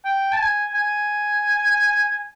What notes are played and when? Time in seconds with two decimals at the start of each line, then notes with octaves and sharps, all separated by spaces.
0.05 G5
0.32 A5
0.40 G#5
0.74 G#5